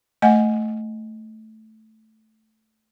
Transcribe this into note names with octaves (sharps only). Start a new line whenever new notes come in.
A3 D#5 F#5 G#5